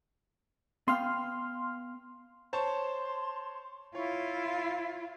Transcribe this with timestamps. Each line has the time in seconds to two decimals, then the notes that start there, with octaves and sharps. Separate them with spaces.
0.88 B3 F5 G5 C6 F6
2.53 C5 C#5 A5 C6
3.95 E4 F4 C#5